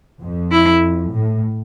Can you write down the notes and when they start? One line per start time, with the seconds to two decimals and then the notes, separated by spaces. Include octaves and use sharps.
0.22 F2
0.52 E4
1.12 A2